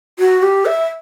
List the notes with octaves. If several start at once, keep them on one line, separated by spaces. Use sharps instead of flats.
F#4
G4
E5